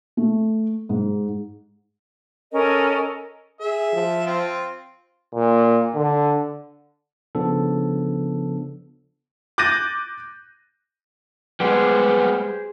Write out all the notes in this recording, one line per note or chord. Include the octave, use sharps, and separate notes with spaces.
A3
G#2
C#4 A4 A#4 D#5
G#4 E5
F3
C4 F4
A#2
D3
C#3 F3 B3 D4 A4
D6 F#6 G6 A6 A#6 D#7
G3 G#3 B3 G4 G#4 C5